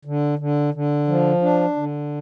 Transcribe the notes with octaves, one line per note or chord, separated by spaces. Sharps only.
D3
D3
D3
F3
D4
D3